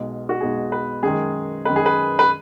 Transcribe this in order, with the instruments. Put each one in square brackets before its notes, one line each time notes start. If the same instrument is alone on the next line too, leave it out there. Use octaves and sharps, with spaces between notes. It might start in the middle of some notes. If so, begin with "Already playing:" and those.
Already playing: [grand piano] B1 B2 G#3
F#4
B1 B2 G#3 G#4
B4
F#2 D#3 G#3 G#4
F#2 D#3 G#3 B4
G#4
B4
B4